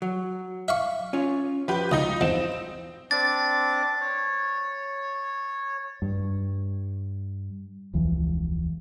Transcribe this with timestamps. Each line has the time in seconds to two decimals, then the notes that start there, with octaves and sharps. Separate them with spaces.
0.02 F#3
0.68 E5 F5 C#6
1.13 C#4 F4
1.68 F3 G4 B4
1.92 C#2 D#4 D#5 D#6
2.21 E2 C4 E7
3.11 C4 D4 D6 A6
4.01 C#5
6.02 G2
7.94 E1 C#2 E3 F3